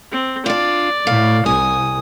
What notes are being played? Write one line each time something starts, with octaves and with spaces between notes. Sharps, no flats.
C4
D4 F4 D5
A2 F5
C2 G#5 D#6